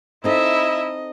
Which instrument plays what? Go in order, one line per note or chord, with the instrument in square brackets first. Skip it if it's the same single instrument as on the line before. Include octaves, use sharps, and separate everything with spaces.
[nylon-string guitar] C4 D#4 A4 [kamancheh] E4 E5 [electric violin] D#5